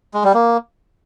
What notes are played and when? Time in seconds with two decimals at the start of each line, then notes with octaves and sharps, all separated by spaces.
0.14 G#3
0.24 G3
0.34 A#3